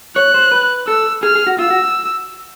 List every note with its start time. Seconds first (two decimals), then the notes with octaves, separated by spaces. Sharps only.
0.16 C#5 F#6
0.34 C5
0.52 B4
0.88 A4 E6
1.23 G#4 F6
1.35 G#4
1.47 F#4
1.59 F4 E6
1.70 F#4